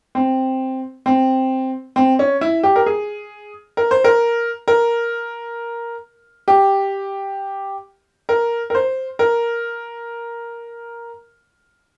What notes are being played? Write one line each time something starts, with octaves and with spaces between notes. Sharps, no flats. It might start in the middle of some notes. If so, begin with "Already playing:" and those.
C4
C4
C4
C#4
E4
G4
A#4
G#4
A#4
C5
A#4
A#4
G4
A#4
A#4
C5
A#4